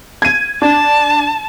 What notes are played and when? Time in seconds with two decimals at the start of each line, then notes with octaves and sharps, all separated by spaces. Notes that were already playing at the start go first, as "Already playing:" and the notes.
0.22 G#6 D#7
0.62 D4 A5